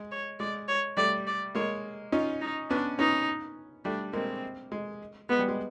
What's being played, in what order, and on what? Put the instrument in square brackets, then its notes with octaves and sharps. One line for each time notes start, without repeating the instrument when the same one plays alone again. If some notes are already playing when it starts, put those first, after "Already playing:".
Already playing: [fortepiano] G#3
[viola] C#5
[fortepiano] G#3 [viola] D5
[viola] C#5
[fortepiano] G3 A3 [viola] D5
[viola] D5
[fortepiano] G#3 A#3 [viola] C#5
[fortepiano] C#4 D#4 [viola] F4
[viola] D#4
[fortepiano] B3 C#4 [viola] D4
[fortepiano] B3 C#4 [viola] D#4
[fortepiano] G3 A3 [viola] D4
[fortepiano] G#3 A#3 [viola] C4
[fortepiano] G#3
[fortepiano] G#3 [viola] B3
[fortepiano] G3
G#3